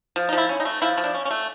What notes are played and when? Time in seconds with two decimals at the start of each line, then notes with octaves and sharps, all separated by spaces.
0.16 F3
0.29 D#4
0.33 F3 E4
0.49 C#4
0.60 D#4
0.65 A3
0.82 F3 E4
0.98 F3
1.04 D4
1.14 C#4
1.25 C#4
1.31 A3